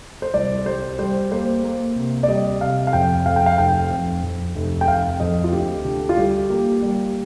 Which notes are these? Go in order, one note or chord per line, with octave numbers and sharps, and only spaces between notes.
C5
C2 D5
G3 C5
G3 C5
A#3 C5
A#3
C3
D5
G3 D#5
C3 F5
F5
F2 G5
F2 F5
G5
F5
F1 G5
F2
F2
F1
G5
F1 F5
F2 D#5
F4
D2 G4
D3 G4
F4
G3 G4
A#3 G4
G3